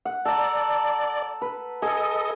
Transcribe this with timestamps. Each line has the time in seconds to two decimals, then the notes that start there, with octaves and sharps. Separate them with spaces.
0.05 F#5
0.25 A4 D5 A#5
1.42 B4
1.82 G#4 A4 D#5